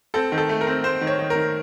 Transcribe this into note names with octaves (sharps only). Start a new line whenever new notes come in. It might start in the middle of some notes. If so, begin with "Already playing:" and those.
C4 A4
D#3
A4
A3
A#4
C4
C4 C5
D#3
C#5
D#3
A#4
D#3